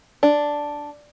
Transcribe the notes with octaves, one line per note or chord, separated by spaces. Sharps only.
D4